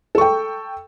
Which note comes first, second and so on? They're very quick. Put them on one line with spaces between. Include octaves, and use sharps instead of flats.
A4 C#6 G5